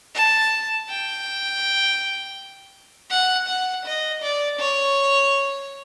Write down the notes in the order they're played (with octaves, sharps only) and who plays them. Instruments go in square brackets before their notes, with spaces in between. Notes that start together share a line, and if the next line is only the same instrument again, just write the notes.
[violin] A5
G5
F#5
F#5
D#5
D5
C#5